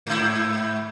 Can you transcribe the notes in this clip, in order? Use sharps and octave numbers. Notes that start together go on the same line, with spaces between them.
G#2 E4